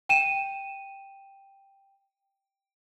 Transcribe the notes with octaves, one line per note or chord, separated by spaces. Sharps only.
G5 D#7 E7